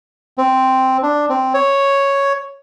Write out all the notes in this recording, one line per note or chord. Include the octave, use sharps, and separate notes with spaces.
C4
D4
C4
C#5